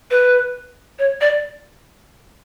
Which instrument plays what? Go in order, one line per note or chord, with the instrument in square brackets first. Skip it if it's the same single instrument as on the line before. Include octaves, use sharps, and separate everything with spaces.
[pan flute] B4
C#5
D5